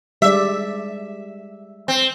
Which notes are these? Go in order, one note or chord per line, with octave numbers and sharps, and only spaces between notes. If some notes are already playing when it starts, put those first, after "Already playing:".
G3 G#3 D5 E5
C4